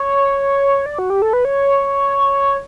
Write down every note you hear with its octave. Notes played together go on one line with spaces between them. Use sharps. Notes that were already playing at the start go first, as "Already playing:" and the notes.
Already playing: C#5
D5
F#4
G4
A4
B4
C#5